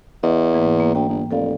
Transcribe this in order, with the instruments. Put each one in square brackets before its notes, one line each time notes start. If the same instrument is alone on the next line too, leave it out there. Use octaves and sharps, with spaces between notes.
[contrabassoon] E2 [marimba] D#5
[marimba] G#2 E3 A#3
A#3
[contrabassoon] D2 [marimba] G5
[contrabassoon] G1
[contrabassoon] F1 [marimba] A4 D5 F5